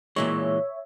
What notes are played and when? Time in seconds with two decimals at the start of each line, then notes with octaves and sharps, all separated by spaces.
0.16 A#2 E3 G#3 C#5 E5